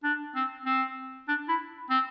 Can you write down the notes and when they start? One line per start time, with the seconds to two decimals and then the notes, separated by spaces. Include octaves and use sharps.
0.04 D4
0.35 C4
0.65 C4
1.28 D4
1.48 E4
1.90 C4